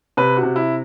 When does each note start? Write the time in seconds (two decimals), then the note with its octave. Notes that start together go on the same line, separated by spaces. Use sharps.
0.17 C3 B4
0.37 F#4
0.43 C3
0.56 E4